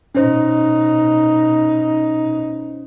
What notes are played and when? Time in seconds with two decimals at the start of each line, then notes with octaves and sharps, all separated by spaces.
0.15 B2 C#4 D#4 C5